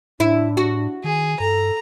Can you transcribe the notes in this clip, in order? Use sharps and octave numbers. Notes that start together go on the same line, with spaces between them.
A2 D4 E4
F#4
D#3 G#4
G2 A4 A#5